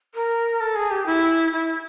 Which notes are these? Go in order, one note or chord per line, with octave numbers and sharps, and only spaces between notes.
A#4
A4
G#4
G4
E4
E4